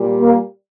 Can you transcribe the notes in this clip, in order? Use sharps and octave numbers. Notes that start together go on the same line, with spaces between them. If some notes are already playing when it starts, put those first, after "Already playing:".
Already playing: A#2 G3
A#3